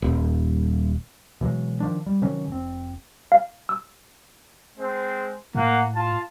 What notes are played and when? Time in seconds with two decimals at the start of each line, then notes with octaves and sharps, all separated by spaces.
0.02 D#1
1.41 B2 E3 F#3 G#3
1.80 D#3 F3 D4
2.06 G3
2.22 C3 D#3 F#3 C#4
2.48 F1 C4
3.32 F5
3.69 E6
4.78 G#3 C4 C5
5.55 A2 A#3 F#5
5.94 F4 A5